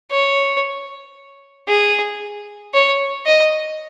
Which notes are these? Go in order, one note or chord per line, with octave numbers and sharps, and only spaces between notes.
C#5
G#4
C#5
D#5